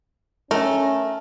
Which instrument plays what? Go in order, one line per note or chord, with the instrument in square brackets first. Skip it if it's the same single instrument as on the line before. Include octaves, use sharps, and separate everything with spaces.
[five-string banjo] A3 [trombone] C#4 [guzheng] A#4